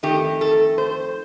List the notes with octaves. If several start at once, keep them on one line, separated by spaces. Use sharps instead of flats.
F2 D#3 A3 G4
A4
C5